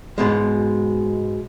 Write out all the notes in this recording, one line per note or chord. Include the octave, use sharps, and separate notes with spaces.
G#2 B2 G#3